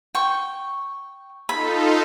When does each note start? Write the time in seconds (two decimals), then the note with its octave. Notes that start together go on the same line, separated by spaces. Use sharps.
0.15 G5 C#6
1.49 D#4 F4 A4 B5